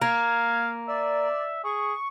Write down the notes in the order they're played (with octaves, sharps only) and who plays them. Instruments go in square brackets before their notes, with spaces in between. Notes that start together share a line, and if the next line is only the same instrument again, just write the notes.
[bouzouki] A#3 [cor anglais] F5 [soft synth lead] G#6
[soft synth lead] D5 [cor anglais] E5
[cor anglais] G#4 [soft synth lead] C#6